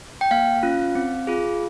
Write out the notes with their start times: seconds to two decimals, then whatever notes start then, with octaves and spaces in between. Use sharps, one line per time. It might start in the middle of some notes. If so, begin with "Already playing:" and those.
0.21 G5
0.31 A#3 F5
0.63 C#4 F4
0.95 C4
1.27 F4 G#4